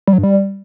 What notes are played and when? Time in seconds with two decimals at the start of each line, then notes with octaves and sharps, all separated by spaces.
0.08 G3
0.13 F#3
0.18 G2
0.23 G3